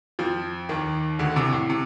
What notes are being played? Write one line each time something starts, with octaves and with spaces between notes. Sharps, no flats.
F2 F3
D#2 D#3
D2 D3
C2 C3
A2
C3